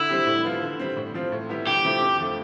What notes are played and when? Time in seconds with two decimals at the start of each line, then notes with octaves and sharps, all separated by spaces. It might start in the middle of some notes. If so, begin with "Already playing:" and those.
Already playing: D3 E4
0.09 G3 C4 G4
0.27 A2
0.44 F3 B3 F4
0.62 D3
0.79 G3 C4
0.97 A2
1.14 F3 C4 F4
1.32 A2
1.49 G3 B3 E4 G4
1.66 D2 G4
1.84 C3 F3 A3 E4
2.02 F2
2.19 D3 F3 A3